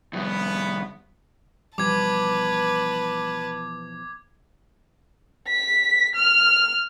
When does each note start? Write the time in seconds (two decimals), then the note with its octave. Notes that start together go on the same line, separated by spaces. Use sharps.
0.13 F2 C3 G3 B3
1.78 B2 E3 F3 G3 B4 A5 D6 G#6
5.48 B6
6.16 F6